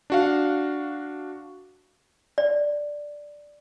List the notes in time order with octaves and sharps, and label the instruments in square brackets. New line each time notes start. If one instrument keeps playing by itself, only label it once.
[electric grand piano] D4 F#4 F5
[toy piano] D5